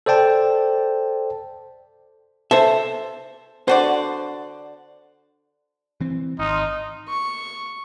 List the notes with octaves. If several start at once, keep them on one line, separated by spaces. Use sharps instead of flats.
A4 C5 D5 G5 A5
A4 C5 E5
D3 F#4 C5 D5
E3 C4
G#1 D#4 C6 D#6 F6
C#6